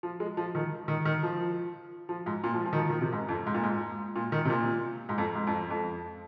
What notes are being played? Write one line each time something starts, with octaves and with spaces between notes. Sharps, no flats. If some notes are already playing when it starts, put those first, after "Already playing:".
F3
G#3
F3
D#3
D#3
D#3
F3
F3
G#2
A#2
F3
F3
D#3
F3
D#3
C3
G#2
F2
G#2
A#2
G#2
A#2
D#3
C3
A#2
G#2
F2
G#2
F2
F2